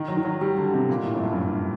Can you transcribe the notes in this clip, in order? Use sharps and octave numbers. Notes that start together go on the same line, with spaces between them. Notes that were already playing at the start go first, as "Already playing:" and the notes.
Already playing: D#3
F#3
D#3
F#3
G3
D3
C3
A#2
A2
F#2
G2
F#2
G2